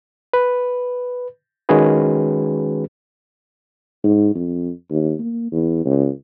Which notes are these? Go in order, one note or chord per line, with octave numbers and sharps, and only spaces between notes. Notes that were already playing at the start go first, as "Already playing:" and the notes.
B4
D#3 G#3 C#4 F#4 G#4 B4
G#2
F2
D#2
A#3
E2
C#2